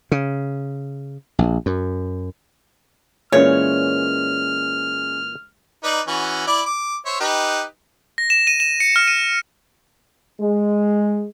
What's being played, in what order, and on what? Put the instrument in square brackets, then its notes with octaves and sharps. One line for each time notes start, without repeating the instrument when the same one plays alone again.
[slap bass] C#3
A#1
F#2
[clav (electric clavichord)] A#2 E3 [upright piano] G#3 C#4 [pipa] C#5 [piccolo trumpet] F6
[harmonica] D#4 B4 D5
E3 C#4 F#4
E4 D5 D6
D6
C5 C#5 E5
D#4 G4 B4
[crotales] A#6
E7
D#7
E7
C#7
F6
D#7
[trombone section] G#3